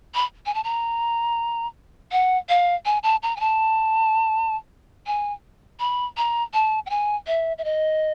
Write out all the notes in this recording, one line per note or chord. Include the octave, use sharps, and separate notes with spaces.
B5
G#5
A5
A#5
F#5
F5
G#5
A5
A#5
G#5
A5
G#5
B5
A#5
A5
G5
G#5
E5
E5
D#5